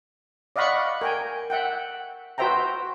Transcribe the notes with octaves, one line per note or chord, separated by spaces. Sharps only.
D5 D#5 F5 F#5 B5 C#6
A#4 G5 G#5
E5 F#5 G5
F#4 B4 C5 E5 G5 A#5